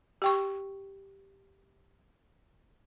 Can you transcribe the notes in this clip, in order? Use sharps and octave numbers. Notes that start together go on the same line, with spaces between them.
G4 G5 C#6